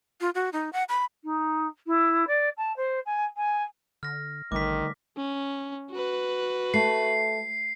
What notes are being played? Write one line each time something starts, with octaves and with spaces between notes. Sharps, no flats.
F4
F#4
D#4
F#5
B5
D#4
E4
D5
A5
C5
G#5
G#5
D3 F6 A#6
A1 D3 D#3 G3 A3 D6 B6
C#4
F#4 B4
A3 C7